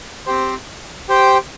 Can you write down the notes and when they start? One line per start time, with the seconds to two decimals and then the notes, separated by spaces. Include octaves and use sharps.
0.26 C4 G4 C5
1.09 G4 C5 G5